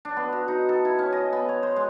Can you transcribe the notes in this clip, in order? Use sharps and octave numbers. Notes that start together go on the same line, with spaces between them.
D4
B3
F#4
D#4
A4
E4
C#4
D#5
B3
C#5
C5
G#3